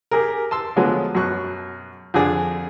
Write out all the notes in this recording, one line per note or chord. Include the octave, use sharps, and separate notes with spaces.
G4 G#4 A#4
A5 C6 E6
D3 F3 F#3 G#3 B3
F#2 B2 C#6 F#6
F2 D3 D4 G#4